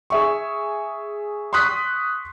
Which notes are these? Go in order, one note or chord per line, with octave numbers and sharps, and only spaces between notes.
G#4 E5 C#6
C6 C#6 D#6 F#6 B6